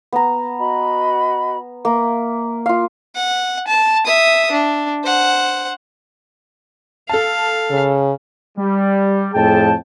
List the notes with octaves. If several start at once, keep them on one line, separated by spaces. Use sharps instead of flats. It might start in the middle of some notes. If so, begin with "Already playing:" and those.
B3 A#5
F#4 D#5 B5
A#3 E5
F4 F5
F#5
A5
E5 D#6
D4
C5 F#5
A4 F5 A5
C#3
G3
F2 A2 G#4 G5 A5